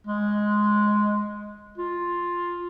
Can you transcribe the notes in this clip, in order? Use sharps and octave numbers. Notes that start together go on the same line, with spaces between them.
G#3
F4